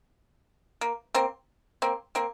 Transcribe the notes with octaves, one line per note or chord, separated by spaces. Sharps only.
A#3
A#3 C4
A#3 C4
A#3 C4